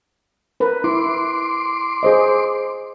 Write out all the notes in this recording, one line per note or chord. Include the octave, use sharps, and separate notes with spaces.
A#4 B4
E4 C6 D6
G#4 C5 D#5